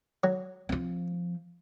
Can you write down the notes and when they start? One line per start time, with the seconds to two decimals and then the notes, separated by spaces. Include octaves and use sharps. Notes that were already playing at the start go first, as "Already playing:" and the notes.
0.24 F#3
0.69 F3 C4